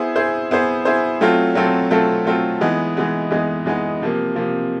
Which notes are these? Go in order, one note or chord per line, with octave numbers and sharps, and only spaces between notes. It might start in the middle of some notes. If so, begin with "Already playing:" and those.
Already playing: B3 E4 G#4 C5
B3 E4 G#4 C5
B3 E4 G#4 C5
B3 E4 G#4 C5
F#3 A3 C4 F4 A4
F#3 A3 C4 F4 A4
F#3 A3 C4 F4 A4
F#3 A3 C4 F4 A4
E3 G#3 B3 D#4
E3 G#3 B3 D#4
E3 G#3 B3 D#4
E3 G#3 B3 D#4
C3 F3 A#3
C3 F3 A#3